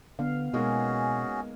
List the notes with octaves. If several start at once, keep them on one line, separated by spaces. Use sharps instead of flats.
D3 B3 F5
B2 G#3 A#3 C#4 D#4 F#4 G#4